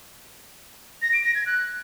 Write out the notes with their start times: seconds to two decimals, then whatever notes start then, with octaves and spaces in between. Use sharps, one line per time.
1.02 A#6
1.13 D7
1.24 A#6
1.35 G#6
1.46 F#6